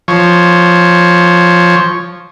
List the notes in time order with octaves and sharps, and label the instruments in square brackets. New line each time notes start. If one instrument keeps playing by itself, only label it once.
[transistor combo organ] F3 C#5